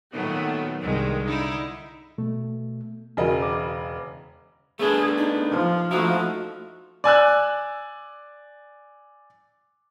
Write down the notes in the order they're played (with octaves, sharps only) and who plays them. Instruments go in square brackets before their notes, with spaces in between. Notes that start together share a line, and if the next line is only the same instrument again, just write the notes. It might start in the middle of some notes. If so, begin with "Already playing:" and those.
[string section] A#2 D#3 F#3 A3 B3
C2 G2 D#3 G#3
D3 D#4 E4
[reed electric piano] B2 A3
[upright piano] E1 C#3 D#5 [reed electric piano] F#4 A#4 G#5
[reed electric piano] D6
[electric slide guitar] A3 B3 D4 [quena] G#4
[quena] D#4
[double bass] F3
[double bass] F3 A3 [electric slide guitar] D#4 E4 [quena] F#4
[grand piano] D5 G#5 E6 F#6